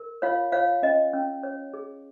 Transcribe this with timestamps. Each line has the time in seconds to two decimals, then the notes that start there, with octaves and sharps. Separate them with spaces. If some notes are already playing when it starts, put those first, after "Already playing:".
Already playing: A#4
0.22 F4 C#5 F5
0.52 F4 C#5 F5
0.83 C#4 D#5
1.13 C#4
1.43 C#5
1.74 G#4